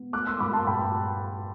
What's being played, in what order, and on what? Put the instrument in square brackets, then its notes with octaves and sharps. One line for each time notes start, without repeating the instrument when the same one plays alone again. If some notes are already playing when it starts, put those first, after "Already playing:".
Already playing: [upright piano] B3
A3 D6 F#6
C6 E6
G2 B5 D6
A5 C6
G2 G5 B5